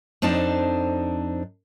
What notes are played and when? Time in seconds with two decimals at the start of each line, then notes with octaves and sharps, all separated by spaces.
0.22 F2 C4 D4 D#4 A5